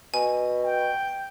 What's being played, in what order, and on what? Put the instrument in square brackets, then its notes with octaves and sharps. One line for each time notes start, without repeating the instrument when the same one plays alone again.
[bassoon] B2 [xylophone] G#5
[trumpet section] G5